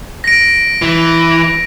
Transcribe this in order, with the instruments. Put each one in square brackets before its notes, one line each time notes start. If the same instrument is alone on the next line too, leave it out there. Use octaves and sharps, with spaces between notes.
[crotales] A#6 D7
[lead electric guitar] E3